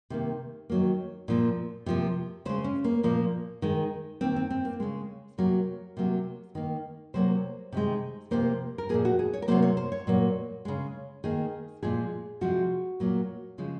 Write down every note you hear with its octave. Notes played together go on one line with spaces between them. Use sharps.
C3 D#3 A#3
D#3 F#3 A#3
A#2 F3 A#3
C3 F3 A#3
C#3 G#3 C5
C#4
A#3
A#2 F3 A#3
D#3 G#3
D#3 A#3 C4
C4
C4
A#3
C#3 G#3
C3 F#3 A#3 A#4
C3 F#3 A#3
D#3 A#3
C3 F#3 A#3 C5
C3 D#3 G#3
C3 F3 A#3 C5
A#4
A#2 F3 A#3 G#4
F#4
G#4
C#5
A#4
C3 F#3 A#3 C5
C#5
C5
C#5
A#2 F#3 A#3
C#3 G#3
D#3 A#3 G#4
A#2 F3 G#3 G#4
C3 F3 G#3 F#4
A#2 F#3 A#3
C#3 F3 G#3